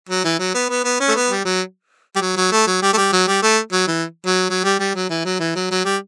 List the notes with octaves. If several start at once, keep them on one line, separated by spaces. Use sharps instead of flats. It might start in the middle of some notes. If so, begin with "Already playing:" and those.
F#3
E3
F#3
B3
B3
B3
C#4
A3
B3
G3
F#3
G3
F#3
F#3
A3
F#3
G3
A3
G3
F#3
G3
A3
F#3
E3
F#3
F#3
G3
G3
F#3
E3
F#3
E3
F#3
F#3
G3